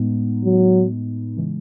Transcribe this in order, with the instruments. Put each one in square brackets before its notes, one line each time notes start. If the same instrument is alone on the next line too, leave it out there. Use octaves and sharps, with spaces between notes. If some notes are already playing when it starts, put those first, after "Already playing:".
Already playing: [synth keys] A2 G#3 B3 D#4
[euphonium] F#3
[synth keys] C#3 E3 G#3